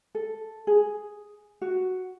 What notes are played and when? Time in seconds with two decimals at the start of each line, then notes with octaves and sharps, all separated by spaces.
0.15 A4
0.67 G#4
1.62 F#4